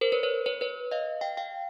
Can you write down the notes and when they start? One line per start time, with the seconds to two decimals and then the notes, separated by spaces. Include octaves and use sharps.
0.01 A#4 C5
0.12 B4 C#5
0.23 B4 C#5
0.46 B4 C#5
0.61 B4 C#5
0.91 D#5 F5
1.21 F5 G5
1.37 F5 G5